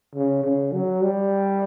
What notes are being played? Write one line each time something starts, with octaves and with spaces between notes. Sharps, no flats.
C#3
C#3
F#3
G3